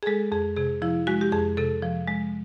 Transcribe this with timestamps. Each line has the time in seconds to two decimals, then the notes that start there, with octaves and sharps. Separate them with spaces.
0.03 G#4
0.06 G#3 A4
0.32 F2 G#4
0.57 C3 G#4
0.82 F3 E4
1.07 G#3 F#4
1.21 G4
1.32 F2 G#4
1.57 C3 A4
1.82 F3
2.08 G#3